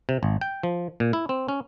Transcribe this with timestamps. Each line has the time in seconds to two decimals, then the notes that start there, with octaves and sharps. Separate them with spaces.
0.09 C3
0.23 G#1
0.41 G5
0.63 F3
1.00 A#2
1.13 E4
1.29 C4
1.49 C#4